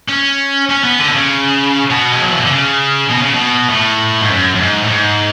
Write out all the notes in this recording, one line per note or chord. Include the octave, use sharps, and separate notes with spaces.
C#4
C#4
B3
D3
B2
C#3
B2
G#3
F#3
E3
D3
C#3
B2
C#3
B2
A2
G#2
F#2
F#2
G#2
A2
G#2